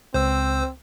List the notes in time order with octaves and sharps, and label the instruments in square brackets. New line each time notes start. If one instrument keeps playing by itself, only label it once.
[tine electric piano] C#2 [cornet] C4 [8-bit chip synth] C5 E6